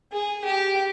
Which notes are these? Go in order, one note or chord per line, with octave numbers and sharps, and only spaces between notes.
G#4
G4